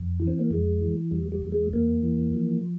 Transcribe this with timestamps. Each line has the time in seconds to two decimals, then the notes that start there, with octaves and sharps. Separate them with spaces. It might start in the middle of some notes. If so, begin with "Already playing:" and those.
Already playing: F2
0.20 E3
0.27 C4
0.39 A#3
0.51 F2 G#3
0.81 E3
1.11 E2 G3
1.32 G3
1.42 E2
1.52 G#3
1.73 E2 A#3
2.03 E3
2.34 F3